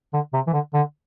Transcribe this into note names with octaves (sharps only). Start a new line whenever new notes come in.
D3
C3
E3
D3
D3